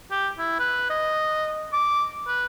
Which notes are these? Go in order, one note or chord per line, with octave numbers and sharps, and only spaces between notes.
G4
E4
B4
D#5
D6
B4